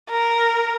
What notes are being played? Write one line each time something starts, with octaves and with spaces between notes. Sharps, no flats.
A#4